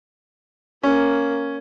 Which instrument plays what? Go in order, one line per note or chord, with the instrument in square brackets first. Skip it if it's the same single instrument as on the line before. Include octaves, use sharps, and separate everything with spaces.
[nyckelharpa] A#3 [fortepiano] C#4